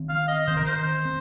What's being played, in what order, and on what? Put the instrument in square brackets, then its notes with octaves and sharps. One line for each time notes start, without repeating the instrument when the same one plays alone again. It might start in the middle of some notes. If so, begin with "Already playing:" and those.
Already playing: [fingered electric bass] D#3 C4
[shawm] F5
D#5
[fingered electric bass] D#3 C4 [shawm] C5
[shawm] A#4
C5
[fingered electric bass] C4